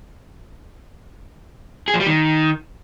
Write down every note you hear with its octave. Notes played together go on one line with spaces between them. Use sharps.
G#4
F3
G3
D#3